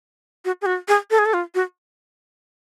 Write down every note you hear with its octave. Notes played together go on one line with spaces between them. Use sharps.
F#4
G#4
F#4
G#4
A4
G#4
A4
F4
F#4